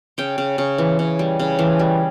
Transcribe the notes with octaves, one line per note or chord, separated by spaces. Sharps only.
C#3 G5
C#3
C#3
E3
C#3
G3
C#3
E3
G3